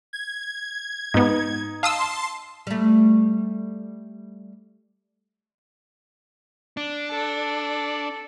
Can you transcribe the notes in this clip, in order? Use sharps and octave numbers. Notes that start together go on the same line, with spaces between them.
G#6
G#2 B3 D#4
F5 A5 C6 D#6 E6
G3 A3
D4
A4